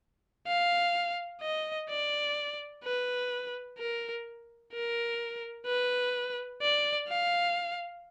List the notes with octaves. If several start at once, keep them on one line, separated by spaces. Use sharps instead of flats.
F5
D#5
D5
B4
A#4
A#4
B4
D5
F5